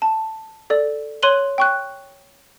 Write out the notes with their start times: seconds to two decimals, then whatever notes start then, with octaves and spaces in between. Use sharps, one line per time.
0.02 A5
0.70 A4 D5
1.23 C#5 C6 F#6 D#7 F#7 G7
1.58 G5 C#6 F#6